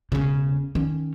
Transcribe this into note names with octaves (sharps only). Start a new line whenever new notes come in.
E1 C#3
D#3 C#4